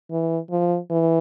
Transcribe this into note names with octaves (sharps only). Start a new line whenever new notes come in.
E3
F3
E3